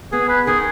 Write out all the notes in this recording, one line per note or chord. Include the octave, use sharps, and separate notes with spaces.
B3 G#4
B4
D#3 G#4